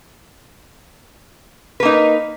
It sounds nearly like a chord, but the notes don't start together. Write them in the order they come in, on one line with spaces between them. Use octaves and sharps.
B4 A#3 D#4